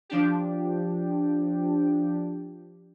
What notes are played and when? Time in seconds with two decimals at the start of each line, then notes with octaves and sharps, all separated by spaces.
0.09 F3 D4 G4